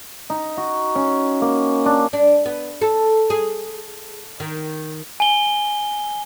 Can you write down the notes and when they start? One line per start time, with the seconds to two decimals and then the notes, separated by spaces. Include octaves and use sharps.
0.30 D#4
0.57 F#4
0.95 C#4
1.42 A#3
1.86 D4
2.13 D4
2.46 B3
2.81 A4
3.30 G#4
4.40 D#3
5.20 G#5 G7